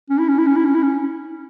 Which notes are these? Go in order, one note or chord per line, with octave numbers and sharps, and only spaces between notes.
C#4
E4
C#4
E4
C#4
E4
C#4
E4
C#4